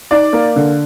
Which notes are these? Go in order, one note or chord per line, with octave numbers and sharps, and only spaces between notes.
D#4 D5
A#3
D3